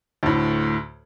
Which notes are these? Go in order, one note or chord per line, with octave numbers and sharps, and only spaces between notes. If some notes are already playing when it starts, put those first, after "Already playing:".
D2 A2